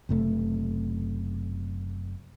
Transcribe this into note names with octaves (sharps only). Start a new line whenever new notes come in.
F#1 C3 A3